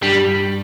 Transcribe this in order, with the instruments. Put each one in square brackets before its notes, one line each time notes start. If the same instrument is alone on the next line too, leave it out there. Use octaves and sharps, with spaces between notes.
[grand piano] G2 [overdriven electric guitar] G3